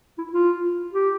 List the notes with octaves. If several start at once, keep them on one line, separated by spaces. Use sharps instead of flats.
E4
F4
G4